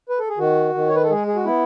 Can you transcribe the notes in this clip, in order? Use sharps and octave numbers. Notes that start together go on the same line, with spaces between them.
B4
A4
G#4
D#3 F#4
D#3
C#5
B4
A4
G#3 G#4
G#4
F#4
B3 E4